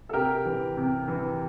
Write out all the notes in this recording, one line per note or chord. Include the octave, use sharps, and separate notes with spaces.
A4
C3 G4 A#4
E3
C3
E3